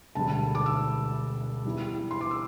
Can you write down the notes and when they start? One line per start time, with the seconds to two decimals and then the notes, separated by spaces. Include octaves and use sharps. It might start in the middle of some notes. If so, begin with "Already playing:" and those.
0.15 E1 D2 D3 G3 A5
0.55 D6
0.66 E6
1.65 E2 E3 G3
2.11 C6
2.21 D6
2.31 E6